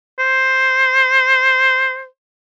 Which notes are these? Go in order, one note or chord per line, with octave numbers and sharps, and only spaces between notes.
C5